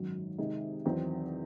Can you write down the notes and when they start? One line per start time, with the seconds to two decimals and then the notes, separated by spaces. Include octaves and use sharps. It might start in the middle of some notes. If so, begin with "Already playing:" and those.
Already playing: G#1 F#2 D#3 F#3
0.38 C3 D#3 G#3 D#4 G#4
0.85 E2 D#3 F#3 C4 D#4